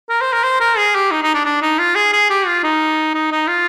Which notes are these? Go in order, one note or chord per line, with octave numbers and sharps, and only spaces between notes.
A#4
C5
A#4
C5
A#4
G#4
G4
D#4
D#4
D4
D4
D#4
F4
G#4
G#4
G4
F4
D#4
D#4
D#4
F4